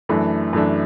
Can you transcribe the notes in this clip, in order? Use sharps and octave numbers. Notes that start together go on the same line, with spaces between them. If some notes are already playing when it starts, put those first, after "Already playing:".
F#2 E3 A3 D4
F#2 E3 A3 D4